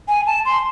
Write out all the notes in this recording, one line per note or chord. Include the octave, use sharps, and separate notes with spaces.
G#5
A5
C6